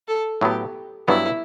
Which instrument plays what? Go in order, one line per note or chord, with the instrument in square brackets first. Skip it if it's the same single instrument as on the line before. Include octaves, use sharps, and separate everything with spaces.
[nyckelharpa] A4
[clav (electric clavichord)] A2 F#3 B3 [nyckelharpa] G4
[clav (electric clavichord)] G2 F#3 B3 [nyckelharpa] E4